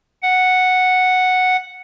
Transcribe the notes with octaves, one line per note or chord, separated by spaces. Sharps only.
F#5